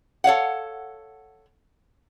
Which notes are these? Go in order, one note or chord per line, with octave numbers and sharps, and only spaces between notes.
A4 C#5 F5 F#5